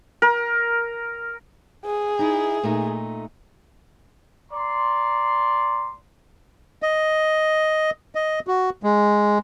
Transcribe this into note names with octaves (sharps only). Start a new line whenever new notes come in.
A#4
G#4
D#4 E4
A#2 A3 D#4
D5 A#5 C6
D#5
D#5
F#4
G#3